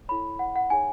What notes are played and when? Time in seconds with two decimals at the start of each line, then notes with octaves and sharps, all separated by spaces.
0.08 E4 A4 C#5 B5
0.39 F#5
0.56 F#5
0.70 D#4 G#4 C#5 G#5